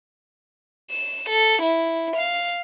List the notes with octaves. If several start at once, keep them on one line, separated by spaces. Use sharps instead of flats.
E7
A4
E4
F5